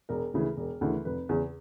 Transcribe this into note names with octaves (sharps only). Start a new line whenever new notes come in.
E1 A#4
D2 C#3 E3
E1
D2 C#3 E3
F1 B4
E2 C#3